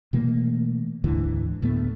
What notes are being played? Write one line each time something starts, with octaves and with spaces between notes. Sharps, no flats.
B2 E3 A3 A#3
D2 G#2 D3 E3
D2 A2 A3 B3